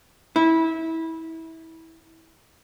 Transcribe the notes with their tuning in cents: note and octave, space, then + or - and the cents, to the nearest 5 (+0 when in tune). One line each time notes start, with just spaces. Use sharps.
E4 -25